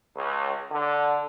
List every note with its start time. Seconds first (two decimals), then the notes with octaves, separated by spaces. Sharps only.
0.15 C#2
0.71 D3